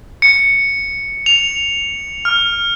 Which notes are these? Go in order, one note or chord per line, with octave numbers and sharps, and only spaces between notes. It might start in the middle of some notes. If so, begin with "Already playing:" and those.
C#7
F7
F6